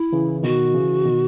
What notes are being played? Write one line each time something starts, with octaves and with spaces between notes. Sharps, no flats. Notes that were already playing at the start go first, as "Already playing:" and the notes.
Already playing: E4
C#3 E3
B2 D#3 F#4
C#3 E3
B2 D#3